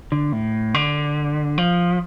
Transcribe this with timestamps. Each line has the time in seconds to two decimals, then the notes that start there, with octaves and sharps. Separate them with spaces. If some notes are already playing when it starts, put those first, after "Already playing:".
0.12 D3
0.33 A2
0.74 D3
1.58 F3